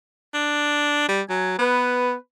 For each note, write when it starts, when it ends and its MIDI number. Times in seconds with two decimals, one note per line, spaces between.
0.34 1.05 62
1.08 1.22 55
1.30 1.55 54
1.30 1.53 80
1.59 2.14 59
1.59 2.15 71